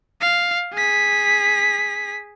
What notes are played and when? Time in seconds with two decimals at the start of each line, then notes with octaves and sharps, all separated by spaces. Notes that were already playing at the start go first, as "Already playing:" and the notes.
0.21 F5
0.74 G#4 B6